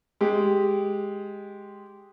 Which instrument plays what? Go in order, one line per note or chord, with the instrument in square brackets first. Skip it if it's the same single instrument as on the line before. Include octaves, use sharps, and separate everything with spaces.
[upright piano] G#3 G4